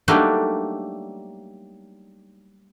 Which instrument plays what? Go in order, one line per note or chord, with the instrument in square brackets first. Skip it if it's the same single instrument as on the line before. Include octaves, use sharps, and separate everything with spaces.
[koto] F#3 G3 A3 A#3 D4 D#4